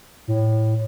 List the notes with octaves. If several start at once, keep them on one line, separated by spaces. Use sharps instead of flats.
A2